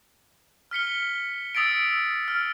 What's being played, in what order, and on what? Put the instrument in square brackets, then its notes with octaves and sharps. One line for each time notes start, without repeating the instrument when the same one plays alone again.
[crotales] F6 B6 C#7 G7
D#6 E6 A6 B6 D7
F6